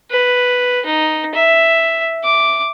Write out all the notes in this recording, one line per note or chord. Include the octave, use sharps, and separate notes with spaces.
B4
D#4
E5
D6